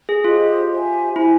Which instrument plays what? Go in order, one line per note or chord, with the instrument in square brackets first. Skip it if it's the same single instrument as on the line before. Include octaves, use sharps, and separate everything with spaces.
[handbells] G#4
[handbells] F4 [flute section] G4 C5 D#5
[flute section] G4 C5 E5 G#5
[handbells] E4 [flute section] G4 C5 E5 G#5